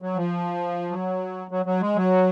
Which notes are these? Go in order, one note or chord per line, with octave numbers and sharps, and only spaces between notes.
F#3
F3
F#3
F#3
F#3
G#3
F#3